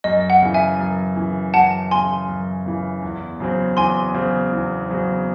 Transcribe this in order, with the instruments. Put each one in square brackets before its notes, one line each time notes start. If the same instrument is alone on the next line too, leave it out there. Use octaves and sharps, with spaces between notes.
[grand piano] F#2 [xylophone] D#5
[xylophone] F#5
[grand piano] C#3 E3
[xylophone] E5 G#5
[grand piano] F#2
C#3 E3
[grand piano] F#2 [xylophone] F#5 A5
[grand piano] C#3 E3 [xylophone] G#5 C6
[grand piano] F#2
C#3 E3
E2
C#3 F#3 C4
[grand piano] E2 [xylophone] G#5 C6
[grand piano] C#3 F#3 C4
E2
C#3 F#3 C4